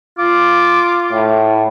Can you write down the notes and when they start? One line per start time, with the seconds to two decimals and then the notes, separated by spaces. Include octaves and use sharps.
0.19 F4 D6
1.12 A2